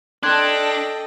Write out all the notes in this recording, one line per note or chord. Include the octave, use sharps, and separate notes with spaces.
D4 A4 D#5 G5 A5 C6 F#6 G#6